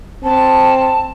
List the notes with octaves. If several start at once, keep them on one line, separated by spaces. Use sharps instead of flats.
C4 A5